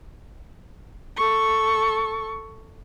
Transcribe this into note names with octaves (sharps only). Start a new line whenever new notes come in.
A4 C#6